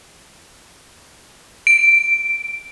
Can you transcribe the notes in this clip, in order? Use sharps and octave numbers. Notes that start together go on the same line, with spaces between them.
D7